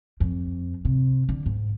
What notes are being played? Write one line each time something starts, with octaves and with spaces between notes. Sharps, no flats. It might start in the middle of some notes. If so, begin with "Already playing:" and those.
F2
C3
D3
G#2